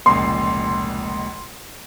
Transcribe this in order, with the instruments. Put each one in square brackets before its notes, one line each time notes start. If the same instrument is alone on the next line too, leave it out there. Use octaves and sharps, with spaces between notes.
[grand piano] F1 C#2 A#2 [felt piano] C6